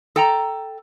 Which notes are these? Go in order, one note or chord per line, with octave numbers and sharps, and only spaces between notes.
A4 G5 A#5